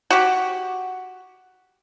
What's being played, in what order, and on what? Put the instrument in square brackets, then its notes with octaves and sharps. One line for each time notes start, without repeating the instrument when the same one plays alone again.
[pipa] F#4 G4